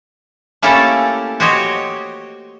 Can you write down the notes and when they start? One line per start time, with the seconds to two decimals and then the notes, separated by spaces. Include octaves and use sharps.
0.62 A3 A#3 C#4 E4 G4 A4
1.40 F#4 G4 C5 C#5 D#5